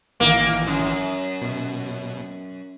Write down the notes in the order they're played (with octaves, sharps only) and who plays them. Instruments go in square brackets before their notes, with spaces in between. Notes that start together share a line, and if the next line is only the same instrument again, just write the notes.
[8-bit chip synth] A1 D#3 E3 [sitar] A#3
[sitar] F#2
[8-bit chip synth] B2